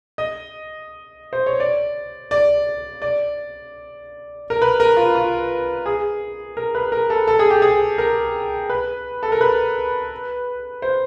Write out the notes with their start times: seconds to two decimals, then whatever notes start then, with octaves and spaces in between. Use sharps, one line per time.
0.18 D#5
1.33 C5
1.46 C#5
1.60 D5
2.31 D5
3.02 D5
4.50 A#4
4.62 B4
4.80 A#4
4.97 F4
5.15 F4
5.86 G#4
6.57 A#4
6.75 B4
6.92 A#4
7.10 A4
7.27 A4
7.39 G#4
7.50 G4
7.62 G#4
7.98 A#4
8.70 B4
9.23 A4
9.32 A#4
9.41 B4
10.82 C5